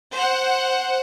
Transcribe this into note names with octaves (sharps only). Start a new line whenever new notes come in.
C5 F#5